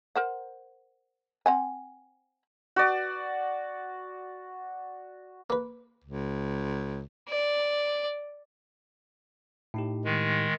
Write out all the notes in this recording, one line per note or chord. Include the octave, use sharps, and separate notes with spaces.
A#4 C5 F#5
C4 F#5 G#5
F#4 D5
A#3 B4
C#2
D5
A2 D#4 G4
D#3 G#3